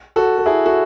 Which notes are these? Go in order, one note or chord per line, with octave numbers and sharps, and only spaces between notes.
F#4 A4
A4
E4 G#4
F#4 A4